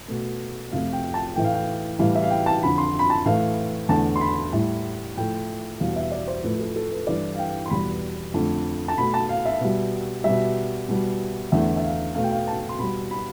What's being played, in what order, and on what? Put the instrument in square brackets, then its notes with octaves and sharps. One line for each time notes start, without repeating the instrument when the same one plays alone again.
[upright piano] B2 A3
F2 C3 F3 A3 F5
G5
A5
A2 E3 A3 G5
F5
G5
A2 E3 G3 F5
E5
F5
G5
A5
F2 D3 F3 B5
C6
B5
A5
A2 E3 A3 F5
E2 D3 A3 A5
C6
B5
A2 G3
A2 F3 A3 G5
E2 B2 G3 F5
E5
D5
C5
A2 F3 A3 B4
A4
A4
B4
G2 E3 G3 D5
F5
G5
C6
E2 B2 G3 B5
F2 D3 A3
A5
B2 A3 B5
A5
F5
E5
B2 G3
B2 G3 E5
B2 G3
E2 D3 A3 E5
E5
F5
B2 A3 F5
G5
F5
A5
C6
B2 G3 B5
B5